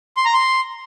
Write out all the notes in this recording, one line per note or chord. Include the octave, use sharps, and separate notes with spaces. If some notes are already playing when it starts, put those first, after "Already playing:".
C6
A#5
C6